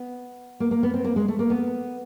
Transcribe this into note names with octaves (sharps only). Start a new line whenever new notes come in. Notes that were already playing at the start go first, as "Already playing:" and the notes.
Already playing: B3
A#3
A#3
B3
C4
A#3
G#3
A3
A#3
B3